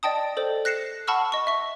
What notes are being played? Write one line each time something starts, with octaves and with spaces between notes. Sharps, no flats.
D5 D#5 G5 A5 D#6
A4 C5 D5
F#6 A#6 C7 C#7 E7
F#5 A5 B5 C#6 E6 F6
D#5 C#6
E5 C#6